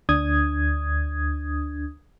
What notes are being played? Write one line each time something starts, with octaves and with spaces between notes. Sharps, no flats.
D2 D4 D#6 G#6